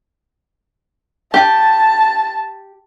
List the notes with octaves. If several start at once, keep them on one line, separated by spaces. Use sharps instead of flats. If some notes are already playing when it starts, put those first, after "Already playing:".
G4 A5